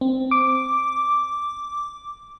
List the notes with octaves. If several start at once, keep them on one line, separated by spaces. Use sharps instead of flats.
C4
D6